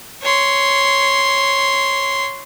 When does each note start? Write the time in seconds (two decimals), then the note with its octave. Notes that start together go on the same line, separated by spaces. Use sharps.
0.22 C#5 C6